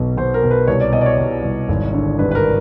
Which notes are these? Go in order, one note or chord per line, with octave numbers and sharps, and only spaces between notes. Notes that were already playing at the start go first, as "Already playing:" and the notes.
Already playing: B1 B2
B2 C5
A#4
B2
B4
C2 C#5
D5
B2 D#5
D5
C#5
B2
C2
G#1
D3
G2 B4
B4
A#4